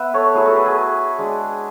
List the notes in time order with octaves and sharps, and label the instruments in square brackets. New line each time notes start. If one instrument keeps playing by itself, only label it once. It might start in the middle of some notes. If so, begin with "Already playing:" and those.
Already playing: [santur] B3 B4 E5 F#5 B5
A4 C#5
F#3 A3 E4 G#4
F#4 A4
G#4 B4
G#4
G#3 D4